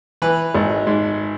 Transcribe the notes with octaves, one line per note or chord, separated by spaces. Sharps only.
E3 B4
G#1
G#2